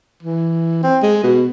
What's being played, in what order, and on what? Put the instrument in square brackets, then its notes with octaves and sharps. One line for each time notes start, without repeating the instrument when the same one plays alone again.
[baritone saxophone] E3
C4
G#3
B2